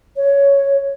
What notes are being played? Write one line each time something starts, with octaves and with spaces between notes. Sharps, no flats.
C#5